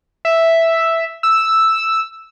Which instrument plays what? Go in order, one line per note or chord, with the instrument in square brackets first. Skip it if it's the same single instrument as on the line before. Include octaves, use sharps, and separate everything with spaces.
[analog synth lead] E5
E6